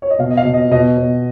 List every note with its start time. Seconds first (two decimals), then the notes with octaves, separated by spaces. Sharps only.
0.02 C#5
0.10 D#5
0.19 B2 F5
0.30 D#5
0.37 F5
0.45 B2
0.54 D#5
0.71 B2 D#5
0.97 B2